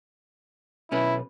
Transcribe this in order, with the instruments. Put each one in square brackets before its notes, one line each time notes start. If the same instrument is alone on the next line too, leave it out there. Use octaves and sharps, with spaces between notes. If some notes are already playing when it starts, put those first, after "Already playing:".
[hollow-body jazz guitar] B1 C#4 B4 [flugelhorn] E4